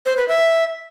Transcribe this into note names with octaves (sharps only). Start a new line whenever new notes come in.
C5
B4
E5